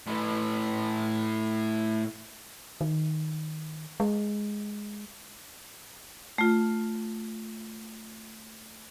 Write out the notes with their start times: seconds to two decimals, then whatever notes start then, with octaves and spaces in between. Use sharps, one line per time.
0.07 A2 B4
2.81 D#3
4.00 G#3
6.38 A3 F4